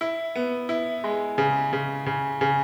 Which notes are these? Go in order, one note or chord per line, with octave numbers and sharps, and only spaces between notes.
E4
B3
E4
G#3
C#3
C#3
C#3
C#3